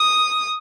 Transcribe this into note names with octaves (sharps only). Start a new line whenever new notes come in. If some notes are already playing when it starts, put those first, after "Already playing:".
Already playing: D#6